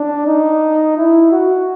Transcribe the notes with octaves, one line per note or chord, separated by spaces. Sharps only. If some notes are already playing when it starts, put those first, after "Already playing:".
Already playing: D4
D#4
E4
F#4